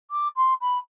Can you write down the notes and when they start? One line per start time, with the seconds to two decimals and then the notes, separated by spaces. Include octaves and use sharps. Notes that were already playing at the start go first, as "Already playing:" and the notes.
0.11 D6
0.36 C6
0.61 B5